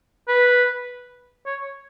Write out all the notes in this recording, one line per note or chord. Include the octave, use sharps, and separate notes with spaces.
B4
C#5